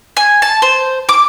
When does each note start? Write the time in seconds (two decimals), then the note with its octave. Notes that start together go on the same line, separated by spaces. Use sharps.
0.17 G#5
0.42 A5
0.62 C5
1.09 D6